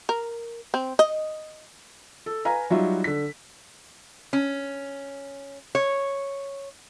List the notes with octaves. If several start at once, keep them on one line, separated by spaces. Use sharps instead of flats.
A#4
C4
D#5
A4
B4 F5 G#5 A#5
F#3 G3 D#4 F4 F#4 E5
D3 B6
C#4
C#5